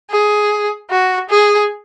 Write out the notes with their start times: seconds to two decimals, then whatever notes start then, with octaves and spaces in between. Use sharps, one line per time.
0.10 G#4
0.90 F#4
1.30 G#4